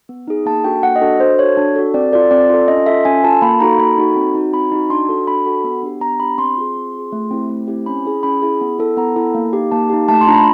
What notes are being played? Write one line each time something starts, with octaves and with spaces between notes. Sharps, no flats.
B3
D#4 G#4
A#3 A5
D4 F#4 A4 G5
A#3 F#5
D#5
D4 F#4 A4
D4 C5
F#4 A4 C#5
D4
F#4 A4
C4 D5
F4 A4 D5
C4 D5
F4 A4
C#4 D#5
F4 A4 E5
C#4 G#5
F4 A4 A5
A#3 B5
D#4 F#4 A4 A#5
A#3 B5
D#4 F#4 A4
C4
D#4 F#4
C4 B5
D#4 F#4
D4 C6
F#4 A4
D4 B5
F#4 A4
B3
D4 G4
B3 A#5
D4 G4 B5
C4 C6
F4 G#4
C4
F4 G#4
A3
C4 E4 G4
A3
C4 E4 G4
C#4 B5
E4 G#4
C#4 B5
E4 G#4
B3
E4 A4
B3 A#5
E4 A4
A#3
D#4 G4
A#3 A5
D#4 G4
A3 A5
C6
D4 F4 A#5
B5